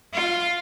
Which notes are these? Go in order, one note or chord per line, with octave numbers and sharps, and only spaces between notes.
F4